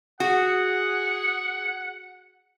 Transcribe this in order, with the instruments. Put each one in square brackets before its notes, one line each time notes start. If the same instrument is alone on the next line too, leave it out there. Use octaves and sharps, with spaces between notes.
[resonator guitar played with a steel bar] F#4 [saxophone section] G#4 [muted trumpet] F#5